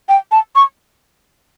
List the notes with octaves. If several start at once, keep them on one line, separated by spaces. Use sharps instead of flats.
G5
A5
C#6